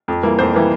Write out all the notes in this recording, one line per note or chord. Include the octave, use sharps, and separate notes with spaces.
F2
E3 G3 A#3
F2 C5
E3 G3 A#3